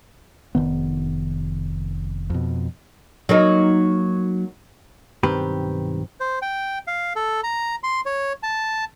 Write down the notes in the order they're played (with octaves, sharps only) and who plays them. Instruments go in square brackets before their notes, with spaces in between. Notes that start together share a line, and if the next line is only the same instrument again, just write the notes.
[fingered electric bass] F1 D#3 B3
F2 B2
[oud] F#3 A#3 D#4
[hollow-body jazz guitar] B1 G2 D#3 C4 G4 B4
[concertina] C5
G5
F5
A4
A#5
C6
C#5
A5